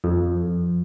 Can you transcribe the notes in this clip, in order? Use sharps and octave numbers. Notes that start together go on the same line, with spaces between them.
F2